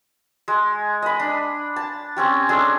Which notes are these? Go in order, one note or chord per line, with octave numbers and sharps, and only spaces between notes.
G#3
D#5 B5
D4
A5
C4 C#4 G4
G#3 D4 G#4 A4